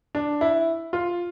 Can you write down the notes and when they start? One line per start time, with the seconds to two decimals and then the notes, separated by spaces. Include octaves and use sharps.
0.15 D4
0.41 E4
0.93 F4